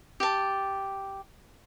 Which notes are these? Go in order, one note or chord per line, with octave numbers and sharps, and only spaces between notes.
G4 A5